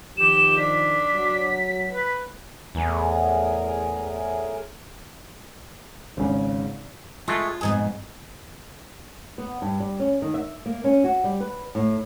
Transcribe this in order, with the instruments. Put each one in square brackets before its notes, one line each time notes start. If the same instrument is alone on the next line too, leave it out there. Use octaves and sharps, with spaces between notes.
[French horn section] D#3 F3 [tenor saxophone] G4 [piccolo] E7
[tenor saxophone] D4 [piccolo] B6
[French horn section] F#3
[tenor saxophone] B4
[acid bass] E2 [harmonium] A2 G#4 A#4
[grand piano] G#1 C#3
[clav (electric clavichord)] G#3 A3 [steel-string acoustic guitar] F4
[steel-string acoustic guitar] F2 G#2 B2 [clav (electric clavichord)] G#4
[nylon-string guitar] B3
G2
G3
C#4
D#3
E5
A#3
C#4
F#4
G3
B4
A2